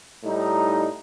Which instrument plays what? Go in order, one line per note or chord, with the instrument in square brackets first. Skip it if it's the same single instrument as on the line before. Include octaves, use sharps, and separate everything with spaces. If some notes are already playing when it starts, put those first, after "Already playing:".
[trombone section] A2 G3 D#4